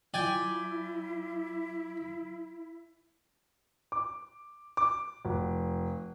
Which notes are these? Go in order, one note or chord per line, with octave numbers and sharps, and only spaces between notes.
F#3 E4 F4 D5 G5 G#5
D6
D6
F1